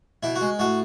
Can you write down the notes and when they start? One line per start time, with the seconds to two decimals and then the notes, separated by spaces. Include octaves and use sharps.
0.23 B2 E4
0.35 F#4
0.41 G#3
0.59 A2 F#4